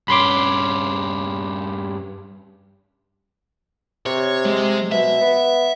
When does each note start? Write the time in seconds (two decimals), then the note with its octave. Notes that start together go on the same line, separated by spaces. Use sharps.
0.08 G2 C#4 B5 C6 D6
4.06 C3 C#5
4.46 G#3
4.92 B2 E5
5.21 B3